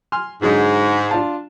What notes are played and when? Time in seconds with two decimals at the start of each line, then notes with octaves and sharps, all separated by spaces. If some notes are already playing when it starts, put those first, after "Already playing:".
0.12 G#5 C6 F6
0.42 G#2 D3 F#3 G#3
1.11 D4 F4 A5